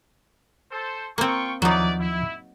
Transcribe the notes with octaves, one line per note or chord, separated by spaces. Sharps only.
A4 C5
A#3 C4 F4 G5 C#6
D#2 F3 F#3 D#4 E4 B4 D5
E4